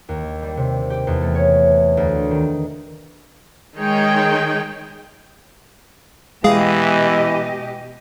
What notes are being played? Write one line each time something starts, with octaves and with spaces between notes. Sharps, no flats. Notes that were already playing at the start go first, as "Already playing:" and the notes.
D#2
G3
C3
G4
E2
A3
C#5
D2
D#3
D#3 G#3 D#4 G#4 C#5 G5
B2 E3 G#3 G4 G#4 D#5 F5